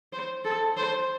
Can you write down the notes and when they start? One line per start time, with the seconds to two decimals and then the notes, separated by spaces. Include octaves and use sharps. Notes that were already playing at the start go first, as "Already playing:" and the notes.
0.13 C5
0.45 A4
0.77 C5